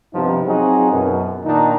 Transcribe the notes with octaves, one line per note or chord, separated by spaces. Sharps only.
G2 C3 F3 B3 D#4
F#3 C4 D#4 F4 F#4 G#4
F#2 B2
A#2 D#3 A#3 D4 D#4